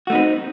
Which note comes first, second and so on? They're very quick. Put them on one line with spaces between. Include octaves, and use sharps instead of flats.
F#4 A3 D#4 B3 C4